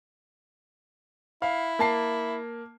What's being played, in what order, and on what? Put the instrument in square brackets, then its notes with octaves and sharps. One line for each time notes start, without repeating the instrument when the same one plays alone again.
[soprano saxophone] E4 [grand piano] F5
[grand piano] A#3 A5 C7